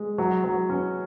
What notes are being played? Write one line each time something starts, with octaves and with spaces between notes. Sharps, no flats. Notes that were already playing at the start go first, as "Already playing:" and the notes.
Already playing: G#3
F#3
F#3
C#4